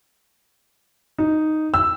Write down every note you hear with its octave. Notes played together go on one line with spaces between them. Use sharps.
D#4
E6